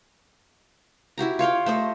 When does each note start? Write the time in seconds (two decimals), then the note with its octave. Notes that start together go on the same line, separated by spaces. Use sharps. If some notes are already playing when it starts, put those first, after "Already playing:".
1.18 E4 F#4 G4 A#5
1.39 F4 C#5 F5 G5
1.66 A3 C5 D#5